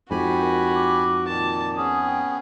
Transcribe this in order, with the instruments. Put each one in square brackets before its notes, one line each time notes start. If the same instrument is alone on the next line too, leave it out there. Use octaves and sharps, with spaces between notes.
[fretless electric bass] F2 G#2 [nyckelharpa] F#4 [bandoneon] G4 G#5 B5
[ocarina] A#4
D6
[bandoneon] A#2 D#3 [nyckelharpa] A5
[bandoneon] B3 C#4 [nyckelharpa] G#4 [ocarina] D#6
[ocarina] G5